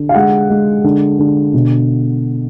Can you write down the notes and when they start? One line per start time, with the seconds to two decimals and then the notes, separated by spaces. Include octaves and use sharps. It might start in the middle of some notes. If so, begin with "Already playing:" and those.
Already playing: D3
0.09 F5
0.14 G#3 F#5
0.50 G#3
0.84 D3
1.19 D3
1.54 B2